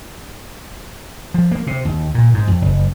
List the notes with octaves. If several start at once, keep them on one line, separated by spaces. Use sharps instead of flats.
F3
A#3
C3
D#2
A#2
G#2
F2
F#1